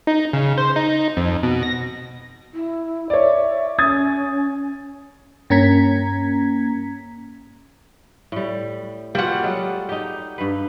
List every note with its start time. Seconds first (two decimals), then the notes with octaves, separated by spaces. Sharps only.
0.07 D#4
0.33 C#3
0.58 C5
0.76 D#4
1.17 F2
1.43 B2
1.63 A#6
2.54 E4
3.10 C#5 D5 E5
3.78 C#4 D#6 G#6 A6
5.50 G2 A#3 C#4 A#5 G#6 B6
8.32 A2 G3
9.15 G3 A#3 F4 F#4 F#5
9.43 F#3 G#3 A4
9.89 D#4 G4
10.38 G2 B4